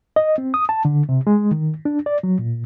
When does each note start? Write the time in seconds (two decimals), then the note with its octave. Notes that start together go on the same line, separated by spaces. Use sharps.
0.16 D#5
0.38 C4
0.54 D#6
0.69 A5
0.85 D3
1.09 C3
1.27 G#3
1.51 D#3
1.85 D4
2.06 D5
2.23 F#3
2.39 A#2